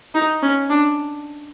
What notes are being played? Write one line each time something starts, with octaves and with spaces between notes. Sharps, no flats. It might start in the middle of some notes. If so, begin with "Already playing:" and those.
D#4
C#4
D4